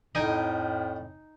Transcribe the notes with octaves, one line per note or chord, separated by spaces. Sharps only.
F2 A2 D#4 D#5 G5 G#5